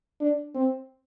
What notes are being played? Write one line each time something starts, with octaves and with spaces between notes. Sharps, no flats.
D4
C4